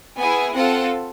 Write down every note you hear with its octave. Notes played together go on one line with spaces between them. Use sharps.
B3 E4 G#4 G#5
C4 F4 A4 F#5